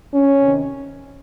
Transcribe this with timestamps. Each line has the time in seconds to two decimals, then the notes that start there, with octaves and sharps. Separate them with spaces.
0.13 C#4
0.41 C3 D#3